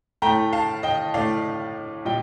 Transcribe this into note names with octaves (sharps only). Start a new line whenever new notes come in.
A2 A3 G5 A#5
F5 A5
D#5 G5
A2 A3 D5 F5
A#2 G3 D#5 G5